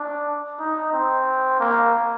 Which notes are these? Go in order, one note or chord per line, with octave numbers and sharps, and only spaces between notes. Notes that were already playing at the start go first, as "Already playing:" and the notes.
Already playing: D4
D#4
C4
A#3